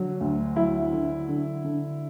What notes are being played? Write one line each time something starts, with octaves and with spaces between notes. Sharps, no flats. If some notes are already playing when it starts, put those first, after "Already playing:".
Already playing: D3 F#3
D2
F#3 E4
D3
D3
D3